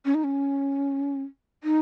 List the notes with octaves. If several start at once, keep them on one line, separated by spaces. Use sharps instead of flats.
C#4
D#4
C#4
D#4